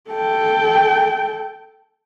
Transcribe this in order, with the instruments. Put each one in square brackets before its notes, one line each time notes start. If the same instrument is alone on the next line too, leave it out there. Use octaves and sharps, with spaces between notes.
[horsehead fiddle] A4 G5